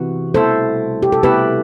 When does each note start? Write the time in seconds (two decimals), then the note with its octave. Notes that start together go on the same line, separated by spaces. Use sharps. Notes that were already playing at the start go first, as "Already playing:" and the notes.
Already playing: C3 E3 B3 F#4
0.34 C2 B2 A3 E4 A4 C5
1.02 G4
1.12 A4
1.23 C2 B2 A3 E4 G4 B4